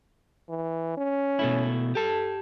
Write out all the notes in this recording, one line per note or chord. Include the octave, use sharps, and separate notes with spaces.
E3
C#4
B2 A3 E4
G4 A4 A5